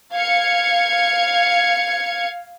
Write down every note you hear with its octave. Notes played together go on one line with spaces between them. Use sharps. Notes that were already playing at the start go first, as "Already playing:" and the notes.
F5 G#6 C#7